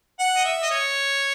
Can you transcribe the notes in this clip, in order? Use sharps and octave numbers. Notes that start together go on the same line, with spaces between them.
F#5
D#5
E5
D#5
C#5